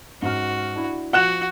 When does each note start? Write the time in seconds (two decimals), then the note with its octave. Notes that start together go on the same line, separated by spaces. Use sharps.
0.22 G#2 C#4 F#4 F6
0.75 D4 E4
1.13 F3 F#4 F#5 F#6 E7